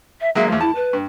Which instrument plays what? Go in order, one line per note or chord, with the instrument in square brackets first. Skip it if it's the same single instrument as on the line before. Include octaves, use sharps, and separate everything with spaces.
[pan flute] E5
[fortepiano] F#3 G#3 A#3 [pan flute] E5
[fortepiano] E2 F3 [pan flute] A3
[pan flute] E4 [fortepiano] A5
[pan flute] B4
[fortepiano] G2